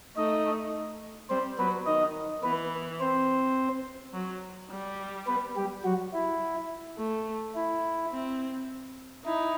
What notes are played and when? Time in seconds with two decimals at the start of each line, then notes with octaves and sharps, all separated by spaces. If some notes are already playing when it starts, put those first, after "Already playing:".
0.16 A3 D#4 D#5
1.30 G3 C4 C5
1.58 F#3 B3 B4
1.86 D#3 D#4 D#5
2.43 E3 B3 B4
3.00 C4 C5
4.13 F#3
4.70 G3
5.27 B3 B4
5.56 G3 G4
5.84 F#3 F#4
6.13 E4
6.98 A3
7.55 E4
8.12 C4
9.24 D#4 E4